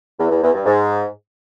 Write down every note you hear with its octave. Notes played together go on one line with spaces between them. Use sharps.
E2
E2
E2
G2
G#2